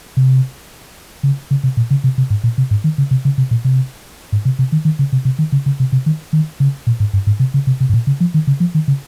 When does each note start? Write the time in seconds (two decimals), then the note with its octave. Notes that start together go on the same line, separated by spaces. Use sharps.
0.17 C3
1.23 C#3
1.51 C#3
1.64 C3
1.77 A#2
1.91 C#3
2.04 C3
2.18 C3
2.30 G#2
2.44 A#2
2.58 C3
2.71 G#2
2.84 D#3
2.98 C#3
3.11 C3
3.25 C#3
3.38 C3
3.51 A#2
3.65 C3
4.32 G#2
4.45 C3
4.59 C3
4.72 D#3
4.85 D#3
4.99 C#3
5.12 C3
5.25 C3
5.39 D#3
5.52 C#3
5.66 C#3
5.80 C3
5.92 C3
6.06 D#3
6.33 D#3
6.60 C#3
6.87 A#2
7.00 G#2
7.13 G2
7.27 G#2
7.40 C3
7.54 C#3
7.67 C3
7.80 C3
7.89 G#2
7.94 A#2
8.07 C#3
8.20 F3
8.34 D#3
8.47 C#3
8.60 F3
8.75 D#3
8.88 C#3